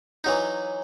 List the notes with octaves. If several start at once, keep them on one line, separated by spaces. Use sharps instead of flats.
E3 F#3 D#4